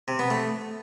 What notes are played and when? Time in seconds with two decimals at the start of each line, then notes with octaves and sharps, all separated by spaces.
0.08 C3
0.19 B3
0.30 A3